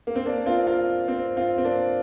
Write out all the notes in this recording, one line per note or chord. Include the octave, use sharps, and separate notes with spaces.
A#3
C4
A#3 D4
C4 F4
F4 A#4
C4
C4 F4
C4
A#3 D4